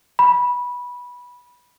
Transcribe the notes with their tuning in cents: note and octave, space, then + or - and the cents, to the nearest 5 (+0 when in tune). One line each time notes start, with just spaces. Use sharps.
B5 -15